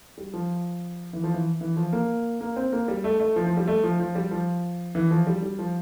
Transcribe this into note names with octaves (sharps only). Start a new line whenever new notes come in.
G3
F3
E3
F3
E3
E3
F3
A#3
A#3
C4
A#3
G3
A3
A3
F3
F3
G3
A3
F3
F3
G3
F3
E3
F3
G3
G3
F3